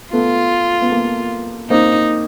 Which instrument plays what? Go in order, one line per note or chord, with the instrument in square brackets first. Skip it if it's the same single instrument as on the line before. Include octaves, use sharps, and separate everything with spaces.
[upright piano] A3 B3 [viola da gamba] F4
[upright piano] B3
A#3
[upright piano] A#3 C4 [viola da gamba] D#4